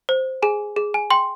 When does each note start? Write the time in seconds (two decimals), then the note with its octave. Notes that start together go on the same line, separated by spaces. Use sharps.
0.09 C5
0.42 G#4 G#5
0.76 G#4
0.94 G#5
1.10 G5 C6